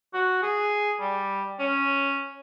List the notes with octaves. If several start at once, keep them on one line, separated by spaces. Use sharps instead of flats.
F#4
G#4
G3
C#4